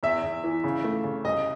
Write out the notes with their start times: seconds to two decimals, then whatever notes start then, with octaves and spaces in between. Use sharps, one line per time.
0.03 E2 E5
0.23 E2
0.44 E3
0.64 C#3
0.84 A3
1.04 C#3
1.24 C2 D#5